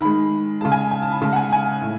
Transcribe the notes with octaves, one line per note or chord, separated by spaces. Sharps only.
D#3 G#3 B5
C#3 G#3 A5
G#5
G#5
A5
B5
C#3 G#3 A5
F#5
G#5
G#5
A2